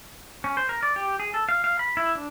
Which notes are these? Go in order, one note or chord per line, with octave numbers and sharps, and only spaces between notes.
C#4
C5
A#4
D5
G4
G#4
A4
F5
F5
B5
E4
D4